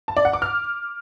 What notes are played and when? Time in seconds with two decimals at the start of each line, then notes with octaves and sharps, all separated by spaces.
0.08 A5
0.17 D5
0.25 F#5
0.33 D6
0.42 F6